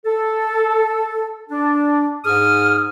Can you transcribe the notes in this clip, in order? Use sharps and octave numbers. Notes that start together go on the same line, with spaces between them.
A4
D4
G#2 G#4 D#6 F6